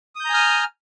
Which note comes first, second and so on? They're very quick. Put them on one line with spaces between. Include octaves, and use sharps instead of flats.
D#6 G6 A#5 G#5 F6